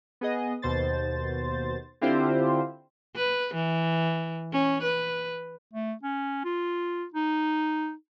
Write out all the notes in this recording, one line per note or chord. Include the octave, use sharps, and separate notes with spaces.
B3 G#4 D#5
D#2 B2 C5 A6
D3 C4 E4 F4 G4 C5
B4
E3
C#4
B4
A3
C#4
F4
D#4